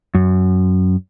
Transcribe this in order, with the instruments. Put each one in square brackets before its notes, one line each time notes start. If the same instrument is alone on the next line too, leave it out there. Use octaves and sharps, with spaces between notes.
[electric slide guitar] F#2